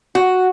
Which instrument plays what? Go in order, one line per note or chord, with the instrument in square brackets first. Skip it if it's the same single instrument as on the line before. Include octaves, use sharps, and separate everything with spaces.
[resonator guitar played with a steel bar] F#4